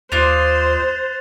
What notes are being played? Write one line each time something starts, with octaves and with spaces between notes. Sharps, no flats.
D#2 F4 C5 D5 D#5 F#6 A6 F7